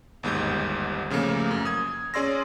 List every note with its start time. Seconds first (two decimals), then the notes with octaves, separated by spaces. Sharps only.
0.23 G1 D#2 G#2 G3 G6
1.10 A#2 C#3 F3 A3 A#3
1.51 F#2
1.65 D#6 G#6
2.14 C#4 G#4 D5 C6 E6 A#6